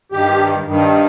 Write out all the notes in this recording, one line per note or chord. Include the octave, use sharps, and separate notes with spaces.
G2 D#3 G4
G2 D#3